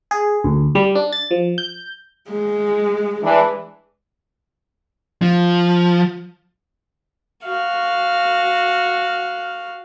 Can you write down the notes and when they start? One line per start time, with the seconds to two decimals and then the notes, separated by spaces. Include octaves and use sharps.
0.11 G#4
0.44 D2
0.75 G3
0.95 D4
1.12 A6
1.31 F3
1.58 G6
2.29 G#3
3.23 E3 D4
5.22 F3
7.44 F#4 F5